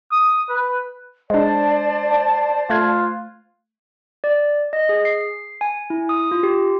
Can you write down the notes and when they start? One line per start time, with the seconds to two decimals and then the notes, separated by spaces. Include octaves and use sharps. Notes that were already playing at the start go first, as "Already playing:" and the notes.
0.12 D#6
0.49 B4
1.30 G#3 D4 C5 D5 A5
2.70 A3 F4 F#6 G#6
4.24 D5
4.73 D#5
4.89 G#4
5.05 C7
5.61 G#5
5.90 E4
6.09 D#6
6.31 F4
6.43 G4